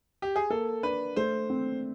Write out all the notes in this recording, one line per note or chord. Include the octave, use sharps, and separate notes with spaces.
G4
G#4
A#3 A4
D4 B4
A3 C5
C4